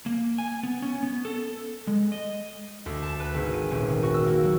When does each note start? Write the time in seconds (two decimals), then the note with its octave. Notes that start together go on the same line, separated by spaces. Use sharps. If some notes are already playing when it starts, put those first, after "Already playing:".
0.06 A#3
0.38 G#5
0.63 B3
0.82 C#4
1.03 B3
1.25 A4
1.87 G#3
2.12 D#5
2.86 D2
3.03 A5
3.20 B4
3.34 G#1
3.54 D#7
3.71 D#1
3.89 D#3
4.03 F#4
4.14 E6
4.26 A#3
4.43 F#3